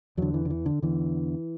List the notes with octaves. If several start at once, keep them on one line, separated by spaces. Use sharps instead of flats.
E2 D3 F#3
E3
D3
E3
D3
E2 D3 E3